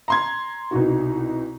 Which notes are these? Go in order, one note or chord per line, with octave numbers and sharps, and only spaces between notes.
A#5 C6 G#6
C2 B2 D#4 F#4